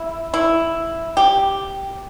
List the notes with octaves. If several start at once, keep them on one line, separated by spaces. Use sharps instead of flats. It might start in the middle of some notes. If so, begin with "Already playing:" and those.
Already playing: E4
E4
G4